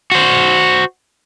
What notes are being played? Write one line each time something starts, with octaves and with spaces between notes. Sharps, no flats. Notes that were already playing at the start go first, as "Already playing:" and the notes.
F#4 C5